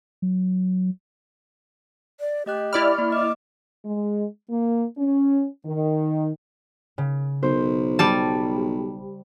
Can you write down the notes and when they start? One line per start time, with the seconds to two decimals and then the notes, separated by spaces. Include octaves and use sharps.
0.22 F#3
2.20 D5
2.46 A3 G4 D#5 F#6
2.73 E4 D5 B5 F6
2.94 A#3 C#6
3.12 D#5 D6
3.85 G#3
4.50 A#3
4.98 C#4
5.65 D#3
6.98 C#3
7.43 B1 C5
7.99 G3 A5